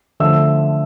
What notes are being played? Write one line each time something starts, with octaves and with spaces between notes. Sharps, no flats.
D3 F3 A3 E5 E6